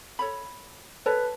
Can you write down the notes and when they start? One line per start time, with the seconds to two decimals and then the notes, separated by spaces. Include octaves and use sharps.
0.19 A4 C#5 B5
1.06 A4 B4 C#5 A5